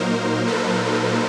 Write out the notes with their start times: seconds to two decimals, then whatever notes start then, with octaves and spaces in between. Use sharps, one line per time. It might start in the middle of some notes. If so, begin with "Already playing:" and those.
Already playing: A#2 F#3 A#3 D#4 A#4 C5
0.48 A4 B4